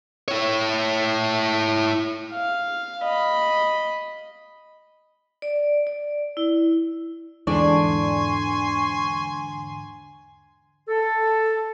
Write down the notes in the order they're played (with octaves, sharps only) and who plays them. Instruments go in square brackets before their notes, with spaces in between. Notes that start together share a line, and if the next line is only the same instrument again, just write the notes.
[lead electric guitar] E4 C#5
[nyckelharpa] F5
D#5 B5
[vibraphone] D5
D5
E4
[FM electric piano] E2 G#2 D3 [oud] D4 [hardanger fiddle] G#5 C6 [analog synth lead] C#6
[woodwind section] A4